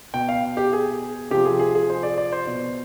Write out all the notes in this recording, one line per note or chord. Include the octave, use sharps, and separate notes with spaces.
B2 G5
F5
G4
G#4
C3 F3 G4
G#4
G#4
G#4
C5
D5
D5
C5
B2